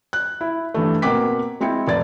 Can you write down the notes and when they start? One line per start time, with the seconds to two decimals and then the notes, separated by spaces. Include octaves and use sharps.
0.13 F#6
0.41 E4
0.74 G2 E3 A3
1.02 B2 A#3 C4 F#5 D6 B6
1.61 G#3 C4 E4 C#7
1.88 F1 D5 A6